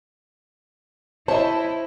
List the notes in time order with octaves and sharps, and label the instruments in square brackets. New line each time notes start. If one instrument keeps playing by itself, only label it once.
[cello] E4 [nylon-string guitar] C5 E5 [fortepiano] C#5 D#5 [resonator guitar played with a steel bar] A5